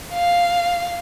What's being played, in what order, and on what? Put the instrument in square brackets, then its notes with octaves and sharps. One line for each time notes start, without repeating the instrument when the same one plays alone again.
[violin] F5